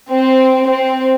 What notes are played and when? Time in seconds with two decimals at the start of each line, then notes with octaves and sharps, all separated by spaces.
0.10 C4
0.69 C4